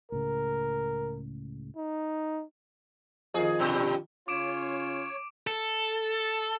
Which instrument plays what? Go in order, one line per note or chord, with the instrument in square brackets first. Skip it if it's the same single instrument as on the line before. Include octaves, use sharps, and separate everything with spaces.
[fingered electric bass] C#2 A2 C#3 [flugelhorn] A#4
[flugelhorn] D#4
[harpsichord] F2 D#3 [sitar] G#4
[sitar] G2 B2
[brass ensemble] C#3 C#4 F4 [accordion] C#5 [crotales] D6 D7 E7
[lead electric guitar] A4